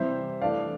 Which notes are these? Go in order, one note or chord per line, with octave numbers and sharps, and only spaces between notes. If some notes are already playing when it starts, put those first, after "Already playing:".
Already playing: C3 E3 G3 C5 E5
E3 A3 D4 D5 F5